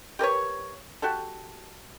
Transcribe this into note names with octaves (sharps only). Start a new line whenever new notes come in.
G4 A#4 B4 C#5
F#4 G4 A4